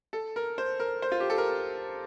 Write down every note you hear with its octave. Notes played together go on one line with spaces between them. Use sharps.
A4
A#4
C5
A#4
C5
F4
G4
A4
A#4